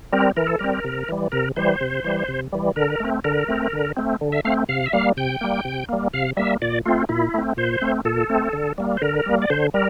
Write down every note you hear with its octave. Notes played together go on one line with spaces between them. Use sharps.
G3 C4 A#4
E3 A#4
A4
G3 C4 A#4
C3
E3 G3
C3 A#4
E3 G3 C5
C3
E3 G3
C3
E3 G3
D3 A#4
A3 C4
D3 A#4
A3 C4
D3
A3 C4
D3
E5
A3 C4 F5
C3 F5
E5
G3 A#3 F5
C3 G5
G3 A#3
C3
G3 A#3
C3 F5
G3 A#3 E5
A#2 D5
A3 C4 F4
A#2 E4
A3 C4
A#2 C5
A3 C4
A#2 A4
A3 C4
D3
G3 A#3
C5
D3 A#4
G3 A#3
D5
D3 C5
G3 A#4